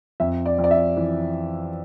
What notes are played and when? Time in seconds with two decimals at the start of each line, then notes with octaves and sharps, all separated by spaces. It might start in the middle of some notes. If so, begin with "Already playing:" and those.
0.20 F2 E5
0.46 D5
0.58 F2
0.64 D5
0.71 E5
0.97 E3